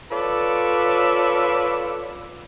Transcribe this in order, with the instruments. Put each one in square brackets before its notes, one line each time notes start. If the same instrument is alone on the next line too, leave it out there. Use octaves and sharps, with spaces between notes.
[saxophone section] F4 A4 B4 C#5 D5